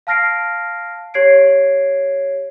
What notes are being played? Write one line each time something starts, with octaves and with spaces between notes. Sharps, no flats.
F5 A5 F6 A#6 C7 D7
G4 C#5 G#6 C7 D7